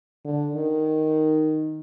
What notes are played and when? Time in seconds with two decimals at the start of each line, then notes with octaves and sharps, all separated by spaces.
0.25 D3
0.54 D#3